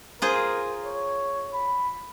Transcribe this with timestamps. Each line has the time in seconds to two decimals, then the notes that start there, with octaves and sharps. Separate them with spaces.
0.22 F4 G#4 A#4 C5
0.85 C#5
1.54 B5